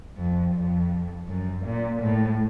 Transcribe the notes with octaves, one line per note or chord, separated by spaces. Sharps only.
F2
F2
F#2
A#2
A2